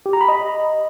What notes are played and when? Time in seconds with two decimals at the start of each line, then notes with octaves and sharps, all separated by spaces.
0.06 G4
0.13 A#5
0.21 B5
0.28 D#5